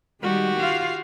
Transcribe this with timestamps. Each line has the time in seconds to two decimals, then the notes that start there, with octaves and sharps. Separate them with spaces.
0.23 D#3 G3 G#3 F#4 G4
0.58 F4 F5